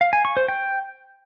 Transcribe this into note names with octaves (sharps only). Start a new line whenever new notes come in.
F5
G#5
C#6
C5
G5